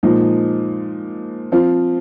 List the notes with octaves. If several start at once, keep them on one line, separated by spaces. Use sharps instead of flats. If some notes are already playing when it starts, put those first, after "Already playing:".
A#2 F3 G#3 D#4
F3 C4 F4